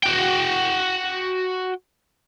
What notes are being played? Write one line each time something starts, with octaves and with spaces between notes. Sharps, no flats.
F#4 G5